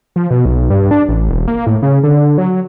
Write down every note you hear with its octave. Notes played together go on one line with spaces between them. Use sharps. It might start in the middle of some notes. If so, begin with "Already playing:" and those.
F3
B2
B1
G2
D4
A1
E1
A#3
A2
C#3
D3
F#3